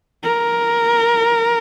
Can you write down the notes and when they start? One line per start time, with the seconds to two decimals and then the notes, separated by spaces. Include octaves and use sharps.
0.24 A#4